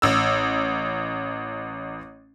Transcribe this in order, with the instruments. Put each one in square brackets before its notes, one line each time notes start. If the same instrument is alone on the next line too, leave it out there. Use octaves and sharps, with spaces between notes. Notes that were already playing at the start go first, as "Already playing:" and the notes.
[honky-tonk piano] A1 E6